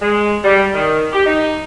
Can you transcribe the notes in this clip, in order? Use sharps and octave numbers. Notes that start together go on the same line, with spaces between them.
G#3
G3
D#3
G4
D#4